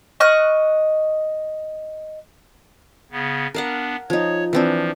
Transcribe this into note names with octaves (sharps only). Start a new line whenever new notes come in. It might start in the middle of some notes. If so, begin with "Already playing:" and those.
D#5 C#6 F6 F#6
C#3 B3
B3 D4 A#4 F5 F#5
F3 D#4 C#5
E3 F3 C4 D4